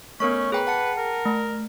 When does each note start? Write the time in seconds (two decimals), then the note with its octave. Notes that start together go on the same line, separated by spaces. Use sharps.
0.20 A3 B3 C#4 A#4 C#5 C#6
0.52 G#4 B4 G5 A#5
0.67 F#5 A5 C#7
0.98 A#4
1.25 A3